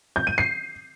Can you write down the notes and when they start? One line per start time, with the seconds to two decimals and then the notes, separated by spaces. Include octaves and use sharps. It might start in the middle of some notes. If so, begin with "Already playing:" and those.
0.16 G6
0.27 D#7
0.38 C7